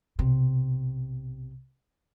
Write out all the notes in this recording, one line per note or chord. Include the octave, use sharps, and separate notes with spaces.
B1 C3